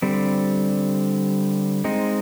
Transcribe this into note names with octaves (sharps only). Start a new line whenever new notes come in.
D3 G3 C4
G#3 C4 D#4